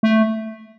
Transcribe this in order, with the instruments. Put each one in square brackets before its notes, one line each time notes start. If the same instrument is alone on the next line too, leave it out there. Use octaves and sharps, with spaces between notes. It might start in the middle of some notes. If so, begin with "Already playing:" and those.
[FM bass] A3